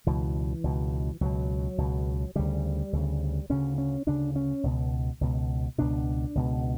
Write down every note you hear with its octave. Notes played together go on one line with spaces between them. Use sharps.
C#2 B2 E3
C#2 B2
C#2 B2 F#3
C#2 B2
D2 C#3 G3
D2 C#3
D2 C#3 C#4
C#4
D2 C#3 D4
C#4
C#2 B2
C#2 B2
C#2 B2 D4
C#2 B2